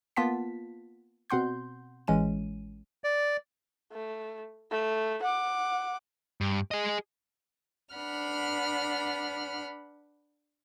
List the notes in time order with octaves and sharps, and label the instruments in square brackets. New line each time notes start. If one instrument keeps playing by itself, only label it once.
[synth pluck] A#3 B3 F4 F#5 A5 B6
B2 C4 F#5 C6 G6
A1 E3 G#3 C#4 D#7
[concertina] D5
[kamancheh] A3
A3
F#5 D6
[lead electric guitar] G2
G#4 D#5
[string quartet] D4 B4 F#5 B5 F6